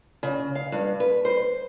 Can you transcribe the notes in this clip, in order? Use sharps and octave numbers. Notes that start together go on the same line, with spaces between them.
C#3
F5
G2
B4
C5